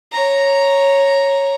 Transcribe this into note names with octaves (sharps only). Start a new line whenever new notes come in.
C#5 A#5